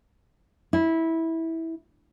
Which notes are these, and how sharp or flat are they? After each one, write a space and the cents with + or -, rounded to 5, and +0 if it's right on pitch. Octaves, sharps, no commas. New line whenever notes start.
E4 -15